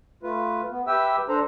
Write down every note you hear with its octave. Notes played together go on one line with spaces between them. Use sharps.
A3 F4 B4
B3
G4 B4 E5 G5 E6
D4 A4 C5 A#5